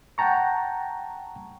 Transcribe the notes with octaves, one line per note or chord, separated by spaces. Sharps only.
F#5 G5 A5 A#5 C#6